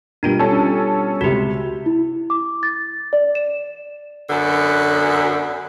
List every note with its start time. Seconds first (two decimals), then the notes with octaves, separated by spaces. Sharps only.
0.23 B2 G3 D4 F4 A#4 D#7
0.39 C#4 A4 A5
1.21 C#2 C3 F#4 G4
1.86 E4
2.30 D6
2.63 A6
3.13 D5
3.35 E7
4.29 F#2 D3 B3